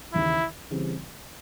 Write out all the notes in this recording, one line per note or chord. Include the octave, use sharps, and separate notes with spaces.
D#2 C#3 E3 E4
C#3 E3 G3 C4